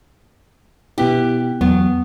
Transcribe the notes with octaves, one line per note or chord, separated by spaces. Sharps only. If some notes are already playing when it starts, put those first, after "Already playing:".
B2 B3 E4 G4
E2 F#3 B3